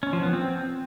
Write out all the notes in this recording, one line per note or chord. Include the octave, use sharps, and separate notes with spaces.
C#4
F3
B3
C4